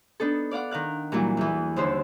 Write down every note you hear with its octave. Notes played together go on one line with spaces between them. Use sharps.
B3 D4 D#4 A4
D5 F5 F#5 D6
D#3 A#4 F5 F#6
A#2 E3 F#3 G3 E4 F4
E2 E3
D#2 D3 D#4 C5 E6